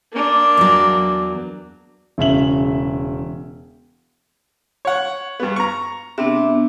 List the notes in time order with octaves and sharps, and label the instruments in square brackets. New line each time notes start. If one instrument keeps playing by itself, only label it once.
[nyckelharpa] A#3 D4
[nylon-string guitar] E2 F#3
[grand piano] E1 C#3 E5 F#7
[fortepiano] C#5 F#5
G2 B3
A#5 C#6
[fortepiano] C3 [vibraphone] B3 D4 E5